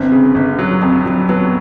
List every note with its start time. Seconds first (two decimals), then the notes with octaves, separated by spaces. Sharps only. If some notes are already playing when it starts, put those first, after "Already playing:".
Already playing: G1 C4
0.12 C#3
0.35 G1
0.59 F#3
0.81 F2
1.06 F#3
1.29 F#3 B3